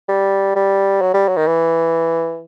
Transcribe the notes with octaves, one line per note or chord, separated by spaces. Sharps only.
G3
G3
F#3
G3
F#3
D#3
E3